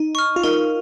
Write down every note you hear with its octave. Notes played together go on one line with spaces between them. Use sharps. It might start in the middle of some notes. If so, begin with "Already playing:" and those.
Already playing: D#4
C#6 F6
F4
D#4 A#4